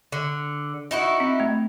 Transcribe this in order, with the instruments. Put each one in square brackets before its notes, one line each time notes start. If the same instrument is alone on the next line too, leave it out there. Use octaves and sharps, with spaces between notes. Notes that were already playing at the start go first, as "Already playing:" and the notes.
[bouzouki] D3
D#4 E4 F#4
[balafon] C4
A3